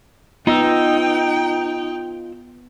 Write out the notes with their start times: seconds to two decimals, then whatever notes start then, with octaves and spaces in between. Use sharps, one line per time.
0.47 B3 D#4 F4 D#5 G5 E6